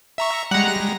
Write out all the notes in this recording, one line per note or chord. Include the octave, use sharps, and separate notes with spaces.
E5 A#5 C#6
G3 G#3 F#5 A#5
A#6